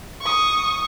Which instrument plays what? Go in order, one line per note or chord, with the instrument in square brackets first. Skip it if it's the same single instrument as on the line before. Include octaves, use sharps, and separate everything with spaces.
[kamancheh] C#6 D#6